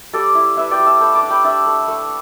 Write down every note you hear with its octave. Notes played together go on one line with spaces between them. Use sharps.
G3 A4 D5
E4
E4 B4 E5
D5 G5
G3
E5 A5
A3 G5 B5
A5 D6
D4
G5 B5
D4 E5 A5
A3
A3